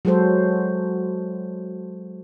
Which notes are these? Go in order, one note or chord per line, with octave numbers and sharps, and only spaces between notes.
F#3 G#3 F#4 A4 C5